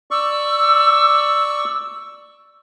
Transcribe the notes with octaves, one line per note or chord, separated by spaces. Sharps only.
D5 C#6 E6